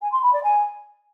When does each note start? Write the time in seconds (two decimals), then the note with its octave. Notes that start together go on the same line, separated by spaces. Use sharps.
0.01 G#5
0.12 C6
0.22 B5
0.33 D5
0.43 G#5